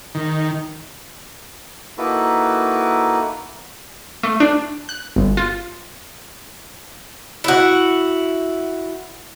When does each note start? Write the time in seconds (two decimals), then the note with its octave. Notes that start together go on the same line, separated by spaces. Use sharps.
0.15 D#3
1.98 A#3 D#4 E4 F#4 A4 B4
4.23 A3
4.40 D4
4.89 F#6
5.16 G1
5.37 F4
7.44 E4 F#4